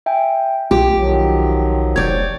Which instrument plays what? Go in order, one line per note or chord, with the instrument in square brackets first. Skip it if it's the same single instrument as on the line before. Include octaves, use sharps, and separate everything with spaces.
[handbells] E5 G5 G#5
[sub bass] B1 [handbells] F4 [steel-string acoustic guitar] G4
[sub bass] B1 [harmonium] D#3 F3 F#3
[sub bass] F1 [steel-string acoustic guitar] C#5 D5 [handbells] G6 G#6